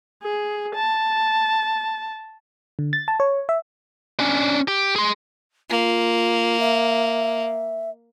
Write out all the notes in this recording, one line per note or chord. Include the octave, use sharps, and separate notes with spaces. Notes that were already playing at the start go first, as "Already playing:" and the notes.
G#4
A5
D3
A6
A5
C#5
E5
C#4 D4
G4
G#4 C6
A#3 F4
E5